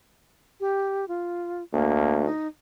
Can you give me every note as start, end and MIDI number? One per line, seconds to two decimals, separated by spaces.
0.60 1.05 67
1.08 1.63 65
1.73 2.27 38
1.73 2.25 58
2.25 2.47 63